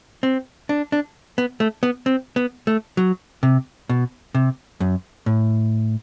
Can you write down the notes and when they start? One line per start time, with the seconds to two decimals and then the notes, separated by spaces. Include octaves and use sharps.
0.23 C4
0.69 D4
0.92 D4
1.38 B3
1.60 A3
1.83 B3
2.06 C4
2.36 B3
2.67 A3
2.97 F#3
3.43 C3
3.89 B2
4.35 C3
4.80 F#2
5.26 A2